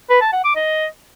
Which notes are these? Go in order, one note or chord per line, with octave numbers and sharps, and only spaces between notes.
B4
A5
F#5
D6
D#5